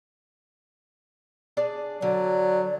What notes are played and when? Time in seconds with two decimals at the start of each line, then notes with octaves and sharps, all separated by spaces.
1.57 D4 G#4 D5
2.02 D3 F#3 D5